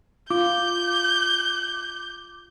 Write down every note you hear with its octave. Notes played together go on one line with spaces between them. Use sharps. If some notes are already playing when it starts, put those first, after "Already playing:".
F4 D6 G6